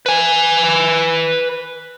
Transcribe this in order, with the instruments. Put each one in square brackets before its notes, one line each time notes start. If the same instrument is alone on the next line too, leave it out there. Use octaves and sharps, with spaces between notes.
[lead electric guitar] B4 G#5